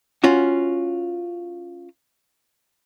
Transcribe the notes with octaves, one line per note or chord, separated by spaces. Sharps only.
C#4 F4 F#4